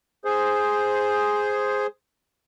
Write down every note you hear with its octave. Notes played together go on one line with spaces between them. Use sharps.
G#4 C5